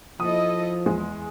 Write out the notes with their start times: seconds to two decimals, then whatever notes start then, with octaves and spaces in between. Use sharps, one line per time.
0.20 F3 E4 A4 D#5 D#6
0.86 E2 G#3